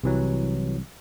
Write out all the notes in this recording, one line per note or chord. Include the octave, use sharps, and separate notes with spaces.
C2 C3 E3 F#3